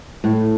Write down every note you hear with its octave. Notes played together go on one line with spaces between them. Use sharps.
A2